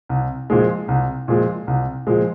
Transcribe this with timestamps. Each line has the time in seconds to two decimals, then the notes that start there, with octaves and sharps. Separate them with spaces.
0.09 C2
0.50 A#2 F3 G#3
0.88 C2
1.28 A#2 F3 G#3
1.67 C2
2.07 A#2 F3 G#3